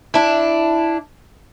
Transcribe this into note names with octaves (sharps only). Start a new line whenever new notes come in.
D4 E4